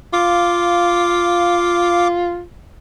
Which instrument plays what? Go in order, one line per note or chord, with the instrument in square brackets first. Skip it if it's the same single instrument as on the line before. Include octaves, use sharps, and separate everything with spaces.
[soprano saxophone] F4 [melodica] F5 D6